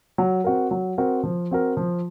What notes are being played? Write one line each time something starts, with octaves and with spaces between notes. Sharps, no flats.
F#3
C4 F#4 A#4
F#3
C4 F#4 A#4
F3
C4 F#4 A#4
F3